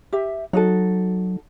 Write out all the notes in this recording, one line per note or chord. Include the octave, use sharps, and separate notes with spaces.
G4 E5
F#3 D#4 F#4 A4